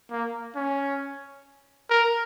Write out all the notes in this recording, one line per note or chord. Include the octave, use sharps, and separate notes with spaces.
A#3
C#4
A#4